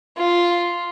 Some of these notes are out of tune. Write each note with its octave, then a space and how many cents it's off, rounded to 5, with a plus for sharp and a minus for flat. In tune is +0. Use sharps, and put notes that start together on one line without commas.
F4 -5